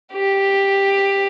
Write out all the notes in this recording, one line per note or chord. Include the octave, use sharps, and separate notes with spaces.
G4